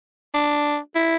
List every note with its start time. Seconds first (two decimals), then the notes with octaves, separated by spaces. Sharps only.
0.34 D4
0.95 E4